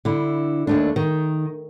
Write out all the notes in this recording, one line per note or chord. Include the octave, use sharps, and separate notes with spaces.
D3 E4
D#2 A3 D4
D#3